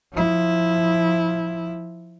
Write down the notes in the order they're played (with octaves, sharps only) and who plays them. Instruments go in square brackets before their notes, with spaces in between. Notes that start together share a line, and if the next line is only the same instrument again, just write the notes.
[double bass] F3 E4